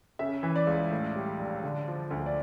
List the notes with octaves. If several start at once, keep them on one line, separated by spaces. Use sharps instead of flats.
C#3 E5
E3
D5
C#2
A2
G3
A#1
D3
F3
D2
D5